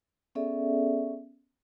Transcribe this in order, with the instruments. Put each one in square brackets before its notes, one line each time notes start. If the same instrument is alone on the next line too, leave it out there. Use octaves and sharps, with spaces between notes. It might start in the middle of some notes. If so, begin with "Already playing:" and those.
[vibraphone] B3 C#4 G#4 A4 D5 E5